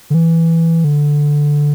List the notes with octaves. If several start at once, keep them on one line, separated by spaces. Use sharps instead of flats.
D3
E3
D3